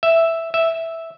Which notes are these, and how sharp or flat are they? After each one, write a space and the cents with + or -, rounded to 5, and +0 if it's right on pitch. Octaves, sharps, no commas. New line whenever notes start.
E5 +0
E5 -5